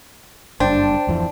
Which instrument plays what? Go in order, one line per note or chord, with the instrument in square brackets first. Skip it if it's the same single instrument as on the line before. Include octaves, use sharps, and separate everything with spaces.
[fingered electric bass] F#1 G2 [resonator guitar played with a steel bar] D4 [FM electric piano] C5 G5 A5
[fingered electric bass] D1 F2 E3